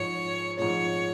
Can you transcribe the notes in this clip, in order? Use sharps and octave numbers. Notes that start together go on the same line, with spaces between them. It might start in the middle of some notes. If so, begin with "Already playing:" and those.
Already playing: G#2 F3 G#3 C#5
G#2 F3 G#3 C#5